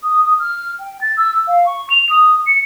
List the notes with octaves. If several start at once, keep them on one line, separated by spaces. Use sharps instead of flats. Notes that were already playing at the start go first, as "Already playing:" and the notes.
D#6
D#6
F6
G5
A6
E6
F5
C#6
F7
D#6
C#7